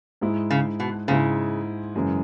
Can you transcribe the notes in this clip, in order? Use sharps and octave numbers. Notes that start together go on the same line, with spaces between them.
G#2 G#3 E4
C#3
B2
G#2 C#3 G#3 E4
F#2 C#3 E3 G#3